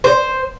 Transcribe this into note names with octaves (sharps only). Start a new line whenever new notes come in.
C5